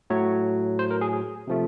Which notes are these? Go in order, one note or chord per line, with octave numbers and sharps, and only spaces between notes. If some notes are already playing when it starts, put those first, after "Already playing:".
A2 F#3 A3 C#5
C5
A#4
G#4
G#4
C3 F3 A3